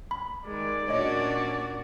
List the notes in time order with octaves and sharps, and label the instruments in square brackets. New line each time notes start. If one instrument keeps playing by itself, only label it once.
[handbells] B5
[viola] D#3 G#3 [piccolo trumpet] D5
[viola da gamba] A#2 A#3 F#4 [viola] C#4 D4 [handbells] C#5 D#5